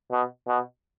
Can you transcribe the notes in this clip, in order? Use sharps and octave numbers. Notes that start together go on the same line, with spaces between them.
B2
B2